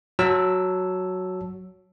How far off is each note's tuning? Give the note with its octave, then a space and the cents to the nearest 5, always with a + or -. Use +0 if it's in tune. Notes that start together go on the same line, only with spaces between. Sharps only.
F#3 +0 A5 +0 E6 +0